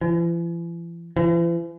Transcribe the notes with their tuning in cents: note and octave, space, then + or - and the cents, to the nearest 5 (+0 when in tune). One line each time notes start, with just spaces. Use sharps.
E3 +45
E3 +45